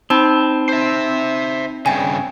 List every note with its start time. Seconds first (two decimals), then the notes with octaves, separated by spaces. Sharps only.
0.10 C4 D#4 A5 B5
0.69 C5 E5
1.86 G2 C#3 G5 G#5